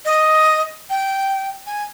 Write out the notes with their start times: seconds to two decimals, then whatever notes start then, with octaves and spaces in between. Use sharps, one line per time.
0.05 D#5
0.90 G5
1.67 G#5